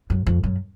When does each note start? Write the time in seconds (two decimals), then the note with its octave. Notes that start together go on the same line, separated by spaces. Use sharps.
0.10 F#2
0.27 F2
0.44 F#2